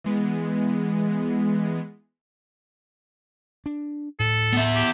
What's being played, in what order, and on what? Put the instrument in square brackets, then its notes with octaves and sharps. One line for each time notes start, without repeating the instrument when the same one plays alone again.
[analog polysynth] E3 G#3 B3
[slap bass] D4
[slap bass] D2 A2 [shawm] A4
[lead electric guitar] B3 E5
[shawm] G4